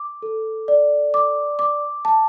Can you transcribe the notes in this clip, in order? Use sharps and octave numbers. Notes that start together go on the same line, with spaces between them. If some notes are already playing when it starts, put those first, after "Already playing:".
Already playing: D6
A4
D5
D6
D6
A5